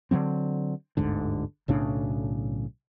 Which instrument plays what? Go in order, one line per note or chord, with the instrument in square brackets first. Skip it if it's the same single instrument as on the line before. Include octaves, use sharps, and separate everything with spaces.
[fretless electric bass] D3 D#3 F#3 C4
G1 D2 G#2 D3
B1 A2 C#3 D4